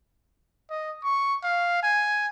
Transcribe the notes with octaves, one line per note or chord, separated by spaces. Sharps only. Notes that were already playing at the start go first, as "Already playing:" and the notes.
D#5
C#6
F5
G#5